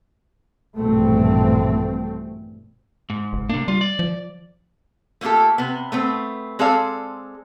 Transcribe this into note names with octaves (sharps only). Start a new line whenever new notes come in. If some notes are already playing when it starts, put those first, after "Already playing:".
A#1 G2 B2 E3 A3 C4
G#2
F#1
C3 A#3 D4
G3 F4
D5
F3
A3 A#3 F4 G4 A4
C3 B3
A3 B3 C4
G#3 C4 G#4 A4 D5 F5